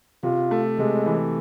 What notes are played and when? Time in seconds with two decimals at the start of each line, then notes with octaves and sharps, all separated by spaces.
0.23 C3 F4
0.51 A3
0.79 C3 G#3
1.06 E3